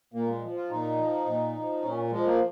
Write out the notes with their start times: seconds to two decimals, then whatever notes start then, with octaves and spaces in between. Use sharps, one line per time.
0.14 A#2 A#3
0.28 G#3
0.43 F3
0.56 F4
0.70 A#2 D#4
0.99 F3
1.26 A#2
1.55 F3
1.83 A#2 C#4
2.11 F3 G#3
2.25 A#3